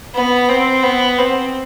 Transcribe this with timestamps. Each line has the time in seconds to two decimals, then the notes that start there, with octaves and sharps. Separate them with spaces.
0.14 B3
0.49 C4
0.82 B3
1.18 C4